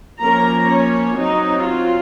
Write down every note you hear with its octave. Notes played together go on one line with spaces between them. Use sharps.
F3 A#3 C#4 A#4 A#5
C#4 C#5
F#3 C4 D#4
F4